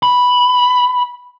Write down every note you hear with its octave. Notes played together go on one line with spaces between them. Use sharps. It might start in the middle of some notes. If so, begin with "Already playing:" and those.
B5